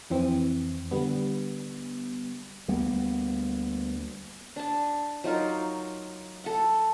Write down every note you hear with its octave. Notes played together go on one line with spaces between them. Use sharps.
F2 E3 C4
D3 G3 B3
D2 G3 A#3 B3
D4 A5
F#3 D#4 F4 A#4
A4 F#5